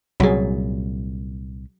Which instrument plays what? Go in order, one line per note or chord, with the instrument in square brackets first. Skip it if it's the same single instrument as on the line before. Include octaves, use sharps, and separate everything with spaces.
[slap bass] C2 A#2 [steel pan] F#3 G#4